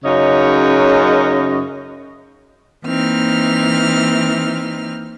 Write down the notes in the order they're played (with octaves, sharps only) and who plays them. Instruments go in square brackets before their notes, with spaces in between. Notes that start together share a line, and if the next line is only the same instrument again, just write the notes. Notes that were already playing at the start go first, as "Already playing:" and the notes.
[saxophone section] F#2 C#3 D#4 C#5 D#5
[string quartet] E3 A#3 C4 D#4 F6